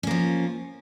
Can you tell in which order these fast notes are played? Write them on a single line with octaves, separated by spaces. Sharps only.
C#4 A#3 F3